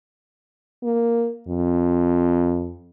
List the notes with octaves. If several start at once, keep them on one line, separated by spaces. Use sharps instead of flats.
A#3
F2